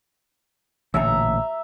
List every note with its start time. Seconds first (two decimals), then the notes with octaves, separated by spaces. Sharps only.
0.94 A1 A#2 D3 E5 A#5